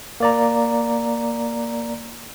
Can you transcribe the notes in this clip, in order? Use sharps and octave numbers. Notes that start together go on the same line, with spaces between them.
A#3 D5 A#5